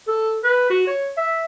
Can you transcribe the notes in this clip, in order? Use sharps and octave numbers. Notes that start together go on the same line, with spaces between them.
A4
B4
F#4
C#5
E5